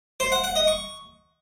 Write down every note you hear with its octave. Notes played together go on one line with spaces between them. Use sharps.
C5
F#5
F#5
D#5
C#6